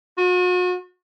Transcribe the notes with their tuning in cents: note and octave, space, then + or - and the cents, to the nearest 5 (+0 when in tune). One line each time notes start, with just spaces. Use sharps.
F#4 -40